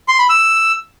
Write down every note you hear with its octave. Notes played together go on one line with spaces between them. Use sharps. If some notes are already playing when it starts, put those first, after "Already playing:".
C6
B5
E6